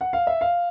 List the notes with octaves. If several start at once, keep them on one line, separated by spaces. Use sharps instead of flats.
F#5
F5
E5
F5